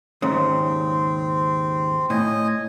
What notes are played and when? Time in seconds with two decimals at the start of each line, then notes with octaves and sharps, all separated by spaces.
0.22 D#2 G#2 C#3 C4
2.10 A2 D#5 G#5